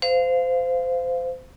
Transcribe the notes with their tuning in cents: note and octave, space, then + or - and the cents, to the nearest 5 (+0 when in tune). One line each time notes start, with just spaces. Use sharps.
C5 -25 F5 +0